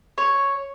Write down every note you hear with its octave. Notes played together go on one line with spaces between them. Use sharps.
C#5